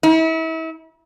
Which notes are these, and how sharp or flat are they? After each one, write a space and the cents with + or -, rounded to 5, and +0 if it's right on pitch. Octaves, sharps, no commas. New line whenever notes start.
E4 -35